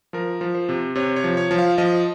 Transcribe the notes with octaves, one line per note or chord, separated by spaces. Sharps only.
F3 A#4
F3
C5
C3
C3 C#5
C#5
F3
C#5
F3
F5
F3 D#5